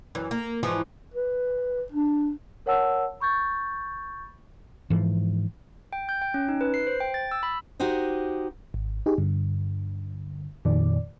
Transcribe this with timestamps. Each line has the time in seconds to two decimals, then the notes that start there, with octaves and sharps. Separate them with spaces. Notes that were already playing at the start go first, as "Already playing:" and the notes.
0.15 F#2 E3
0.31 A#3
0.63 G#2 E3 F3
1.14 B4
1.92 D4
2.66 A#4 C#5 F#5 A5 E6
3.20 B5 C#6 G6 A6
4.90 G#2 E3 F3
5.93 G5
6.09 G6
6.22 G5
6.34 C#4
6.49 D#4
6.61 B4
6.74 C7
6.87 C5
7.00 G5
7.14 A6
7.32 E6
7.43 B5
7.80 D#4 F#4 G4 C5 D#5
8.74 G#1
9.06 D#4 G4 G#4
9.18 G2 D3
10.65 F2 A#2 D#3 D5